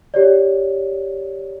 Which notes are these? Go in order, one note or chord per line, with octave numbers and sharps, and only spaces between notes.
G4 C#5 D5